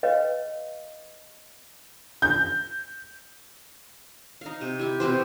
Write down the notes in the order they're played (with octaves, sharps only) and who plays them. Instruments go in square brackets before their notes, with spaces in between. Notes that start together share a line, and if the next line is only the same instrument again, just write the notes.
[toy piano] B4 C#5 D#5 F5 G5
[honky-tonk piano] G6
[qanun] D#4 F5
C3
E4 G4
B2 C4 G4 C5